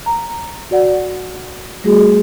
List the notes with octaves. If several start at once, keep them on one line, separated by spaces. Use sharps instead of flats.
A#5
F#4 D5 F#5
G3 A3 F#4 G#4